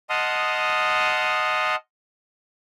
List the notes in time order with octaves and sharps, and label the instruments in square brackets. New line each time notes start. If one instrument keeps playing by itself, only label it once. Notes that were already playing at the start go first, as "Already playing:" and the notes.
[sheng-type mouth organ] D#5 F#5 A5 C6 D#6 F6